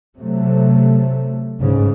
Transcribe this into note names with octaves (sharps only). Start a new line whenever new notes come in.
C3 F#3 A3
G1 C#2 G#2 C#3